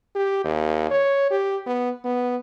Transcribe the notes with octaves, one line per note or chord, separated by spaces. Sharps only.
G4
D#2
C#5
G4
B3
B3